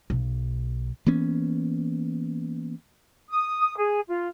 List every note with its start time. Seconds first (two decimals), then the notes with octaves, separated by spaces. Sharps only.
0.10 B1
1.06 E3 A#3 B3 C#4
3.29 D#6
3.78 G#4
4.08 F4